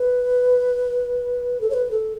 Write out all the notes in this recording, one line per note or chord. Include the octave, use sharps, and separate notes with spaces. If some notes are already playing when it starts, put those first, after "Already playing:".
Already playing: B4
A4
C#5
B4
A4